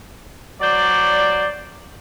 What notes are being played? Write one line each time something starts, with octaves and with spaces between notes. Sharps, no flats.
F#3 C5 D5